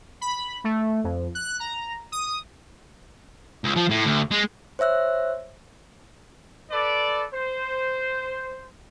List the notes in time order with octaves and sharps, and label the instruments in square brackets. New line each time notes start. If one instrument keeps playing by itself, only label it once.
[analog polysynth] B5
A3
F2
F#6
A#5
D#6
[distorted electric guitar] C#2
F3
A2
D2
G#3
[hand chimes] C5 C#5 E5 E6 F#6
[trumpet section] A4 B4 D5
C5